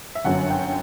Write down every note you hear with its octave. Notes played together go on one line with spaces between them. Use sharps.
E5
G1 F#2 D3 F#3 F#5
G5